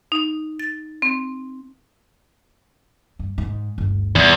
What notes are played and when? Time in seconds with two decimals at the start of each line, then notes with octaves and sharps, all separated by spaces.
0.12 D#4
0.59 A6
1.02 C4
3.19 G2
3.38 G#2
3.78 G1 D2
4.16 E2 G2 D#3